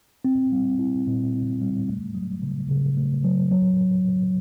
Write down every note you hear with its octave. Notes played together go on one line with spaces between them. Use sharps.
C4
G3
E4
A#2
C4
G3
A3
F#3
C#3
C#3
A3
F#3
F#3